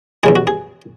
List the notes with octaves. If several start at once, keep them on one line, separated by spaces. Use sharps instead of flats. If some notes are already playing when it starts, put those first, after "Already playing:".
E2 C#3 G#3 G#4
F#4
G#4